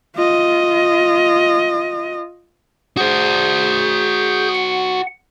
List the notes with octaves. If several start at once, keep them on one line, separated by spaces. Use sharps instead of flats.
F4 D#5
F#4 G#4 C5 G6
F#5